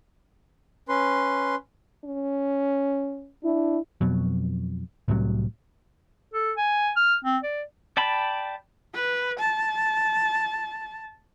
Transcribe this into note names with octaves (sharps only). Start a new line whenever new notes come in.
C#4 B4 C6
C#4
D4 E4
F2 B2 F#3
C2 A2 C3 F#3
A4
G#5
F6
C4
D5
D5 G5 A5 B5
B4
A5